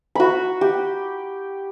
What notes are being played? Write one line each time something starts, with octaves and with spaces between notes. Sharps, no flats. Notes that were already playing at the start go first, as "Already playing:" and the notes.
F#4 B5
G4